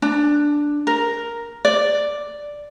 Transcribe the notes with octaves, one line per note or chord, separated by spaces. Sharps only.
D4
A#4
D5